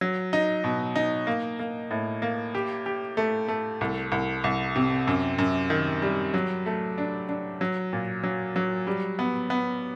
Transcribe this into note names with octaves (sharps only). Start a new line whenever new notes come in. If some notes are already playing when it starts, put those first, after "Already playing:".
F#3
D#4
B2
D#4
A#3
A#3
A2
A#3
G4
G4
A3
A3
C2
C2
C2
C3
F#2
F#2
D#3
G3
F#3
A3
D4
D4
F#3
A#2
F#3
F#3
G3
B3
B3